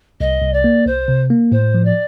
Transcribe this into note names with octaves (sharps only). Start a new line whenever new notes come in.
C2 D#5
C2
D5
A#3
C2 C5
C3
A#3
A2 C5
F3
D5